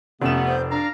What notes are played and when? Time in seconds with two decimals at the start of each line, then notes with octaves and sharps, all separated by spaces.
0.22 F1 C3 A3 B3 C#4 E7
0.46 C5
0.71 D4 F5 A#5